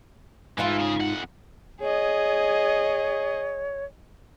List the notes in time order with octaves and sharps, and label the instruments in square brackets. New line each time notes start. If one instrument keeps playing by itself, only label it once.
[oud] G#2 D#4 F4 [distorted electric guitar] E3
[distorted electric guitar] C#3 G#4
F2 F#5
[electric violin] G#4 D#5 [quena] C#5